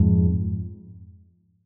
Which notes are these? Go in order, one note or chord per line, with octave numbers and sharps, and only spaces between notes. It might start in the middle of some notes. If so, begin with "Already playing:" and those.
Already playing: F2 G#2